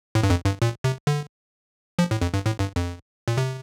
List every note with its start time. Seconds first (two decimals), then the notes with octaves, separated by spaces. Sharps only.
0.15 A2
0.23 G2
0.30 F2
0.46 G2
0.62 A#2
0.84 C3
1.07 D3
1.99 F3
2.11 A2
2.21 F2
2.34 G2
2.46 A2
2.60 G2
2.76 F2
3.28 A#2
3.37 C3